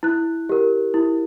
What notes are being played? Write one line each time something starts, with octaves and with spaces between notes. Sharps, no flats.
E4 F#6
G4 A#4
E4